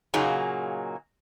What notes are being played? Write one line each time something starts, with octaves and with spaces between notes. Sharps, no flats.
A#2 C#3 F#3 A#3 D#4 G#4